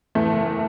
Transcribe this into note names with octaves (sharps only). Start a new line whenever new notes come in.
E2 A3
F#1